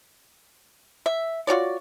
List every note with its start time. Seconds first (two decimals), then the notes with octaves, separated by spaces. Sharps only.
1.06 E5
1.47 F4 F#4 C#5 D5